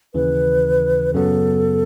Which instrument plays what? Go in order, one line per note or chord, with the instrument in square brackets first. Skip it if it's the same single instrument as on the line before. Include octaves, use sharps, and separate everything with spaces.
[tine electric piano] D#2 C#3 E3 [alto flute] B4
[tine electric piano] F#2 C#3 F#3 B3 [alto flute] A4